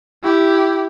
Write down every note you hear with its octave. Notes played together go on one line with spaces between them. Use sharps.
E4 G4